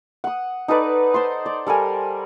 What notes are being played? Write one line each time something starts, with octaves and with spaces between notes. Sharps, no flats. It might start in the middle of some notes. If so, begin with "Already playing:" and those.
F#5 D#6
D#4 A4 B4 D5
C5 A5 C6
D5
G3 A4 A#4 G#5